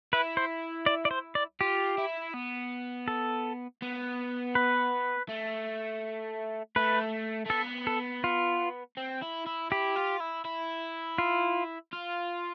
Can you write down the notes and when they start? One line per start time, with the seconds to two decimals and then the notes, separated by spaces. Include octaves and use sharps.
0.13 E4 B4
0.37 C5
0.86 D5
1.05 D5
1.11 C5
1.35 D5
1.60 F4 G4
1.98 E4
2.34 B3
3.08 A4
3.82 B3
4.55 B4
5.29 A3
6.76 A3 B4
7.45 A3
7.49 B3 A4
7.87 A4
8.24 F4
8.97 C4
9.22 E4
9.47 E4
9.71 E4 G4
9.96 F4
10.20 E4
10.45 E4
11.18 F4
11.93 F4